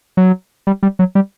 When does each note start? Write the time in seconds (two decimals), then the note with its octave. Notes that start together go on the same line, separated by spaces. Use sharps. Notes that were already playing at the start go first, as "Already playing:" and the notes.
0.17 F#3
0.67 G3
0.83 G3
0.99 F#3
1.15 G3